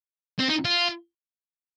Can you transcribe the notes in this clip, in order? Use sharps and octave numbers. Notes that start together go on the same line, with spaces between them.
C4
D#4
F4